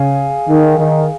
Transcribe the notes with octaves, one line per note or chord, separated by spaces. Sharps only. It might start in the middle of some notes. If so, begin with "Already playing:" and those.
Already playing: C#3 G#4 F5 G#5
D#3
D#3